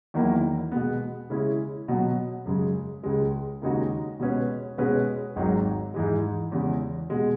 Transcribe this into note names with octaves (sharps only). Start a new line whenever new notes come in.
E2 D#3 F#3 A#3 E4
B2 G#3 B3
C#3 G#3 C#4 E4
B2 F#3 B3
F#2 C#3 G#3
C#2 C#3 G#3
D#2 C#3 G#3 D#4 F#4
B2 G#3 C#4 G#4 B4
B2 G#3 C#4 G#4 B4
G#1 G#2 D#3 F#3
G#2 E3 G#3
E2 C#3 G#3
B2 G#3